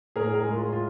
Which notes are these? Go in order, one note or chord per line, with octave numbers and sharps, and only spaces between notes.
A2 G#4 A#4
G#4 A#4
G#3
F4
F4